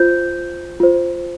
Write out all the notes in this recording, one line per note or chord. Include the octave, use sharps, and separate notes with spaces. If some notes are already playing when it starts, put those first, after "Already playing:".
Already playing: F4 C5 G6
F4 C5